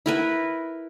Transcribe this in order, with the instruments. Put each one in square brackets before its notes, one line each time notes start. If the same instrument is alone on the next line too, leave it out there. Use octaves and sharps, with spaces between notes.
[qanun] E4 A#4 B4